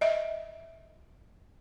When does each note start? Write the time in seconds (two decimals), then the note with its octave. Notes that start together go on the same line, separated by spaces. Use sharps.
0.01 D#5 E5